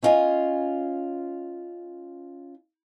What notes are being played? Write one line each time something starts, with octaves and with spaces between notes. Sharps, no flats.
C#4 E4 F4 D#5 G#5